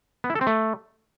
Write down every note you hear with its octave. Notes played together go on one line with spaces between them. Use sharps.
B3
E4
A4
C4
A3